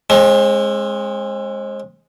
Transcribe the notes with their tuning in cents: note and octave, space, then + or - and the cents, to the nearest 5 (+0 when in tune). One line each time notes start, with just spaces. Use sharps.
G#3 +0 C4 +40